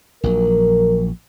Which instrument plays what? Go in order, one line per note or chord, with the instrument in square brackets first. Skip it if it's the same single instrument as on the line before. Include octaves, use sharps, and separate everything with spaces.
[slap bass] A#1 F#3 [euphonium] A#4